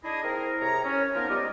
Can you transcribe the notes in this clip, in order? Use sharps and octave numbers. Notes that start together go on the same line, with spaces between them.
D4 E4 G#4 D#5
A#3 C4 E4 G#4 A#4
C2 C3 G#4 C#5 A#5
C#4
F3 A#3 B3 D#4 F4 A#4
G3 G#3 D5 D#5